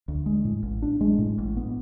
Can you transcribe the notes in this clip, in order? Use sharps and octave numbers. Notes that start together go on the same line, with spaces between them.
D2
G#3
A2
A1
D4
G#3
A2
A1
B3